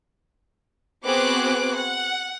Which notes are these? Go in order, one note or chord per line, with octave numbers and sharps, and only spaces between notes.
B3 C4 F#4 G#4 D6 F#6
F#5